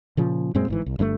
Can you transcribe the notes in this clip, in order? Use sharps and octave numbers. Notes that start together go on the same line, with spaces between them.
A#2 C#3 F3
F#2 A#2 G#3 C4
G1 G#2 E3
C2
G1 G2 D3 A3